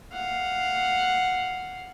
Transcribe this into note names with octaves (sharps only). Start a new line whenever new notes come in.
F5 F#5